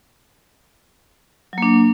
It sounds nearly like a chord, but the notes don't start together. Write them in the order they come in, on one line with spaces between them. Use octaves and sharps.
F#3 A#3 D4